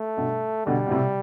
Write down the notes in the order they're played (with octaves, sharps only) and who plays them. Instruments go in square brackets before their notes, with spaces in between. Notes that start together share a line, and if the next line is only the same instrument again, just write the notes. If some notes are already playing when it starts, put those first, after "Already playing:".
Already playing: [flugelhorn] A3
[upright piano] G2 B2
[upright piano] B2 D3 [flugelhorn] G3
[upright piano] B2
A2 C3